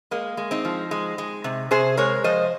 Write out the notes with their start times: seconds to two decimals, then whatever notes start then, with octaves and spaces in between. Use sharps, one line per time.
0.11 G#3 A#3
0.37 G#3
0.51 C4 D#4
0.65 F3
0.91 G#3
1.18 G#3
1.44 C3
1.71 C3 G#4 C5
1.97 G#3 A#4 C#5
2.24 F3 C5 D#5